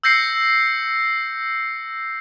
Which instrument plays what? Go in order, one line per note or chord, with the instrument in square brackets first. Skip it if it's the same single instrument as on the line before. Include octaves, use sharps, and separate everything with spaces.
[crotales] E6 G6 A#6 C7 C#7